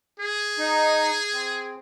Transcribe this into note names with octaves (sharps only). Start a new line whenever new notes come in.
G#4
D#4
C4